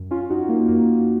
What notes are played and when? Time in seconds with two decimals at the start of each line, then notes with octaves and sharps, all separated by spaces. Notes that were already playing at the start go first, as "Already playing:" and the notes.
Already playing: F#2
0.11 C#4 F4
0.30 F#2 D#4 F#4
0.49 A#3
0.68 F#2 A#3